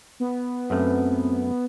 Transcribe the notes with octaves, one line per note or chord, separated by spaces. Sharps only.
B3
F#2 A3 C4